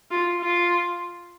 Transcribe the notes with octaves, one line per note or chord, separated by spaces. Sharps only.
F4
F4